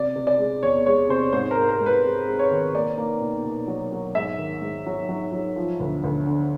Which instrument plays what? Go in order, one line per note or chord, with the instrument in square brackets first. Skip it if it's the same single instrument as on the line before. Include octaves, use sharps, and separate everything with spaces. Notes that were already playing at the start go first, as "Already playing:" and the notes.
Already playing: [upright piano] C3 D5
C3
D5
G#3
E2 C#5
G#3 C#5
C3 C5
G#2 C5
A#4
G#2
A#4
G#2
B4
G#3
G#3
C#5
D#3
A#3 D5
A#3
B2
B2
F#3
F#3
G#2 E5
D#3
G#2
F#3
F#3
F#3
F3
D2
D2
D3